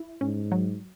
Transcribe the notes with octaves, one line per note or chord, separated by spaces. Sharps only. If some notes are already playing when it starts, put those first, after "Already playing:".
Already playing: E4
G#2 C#4
F#3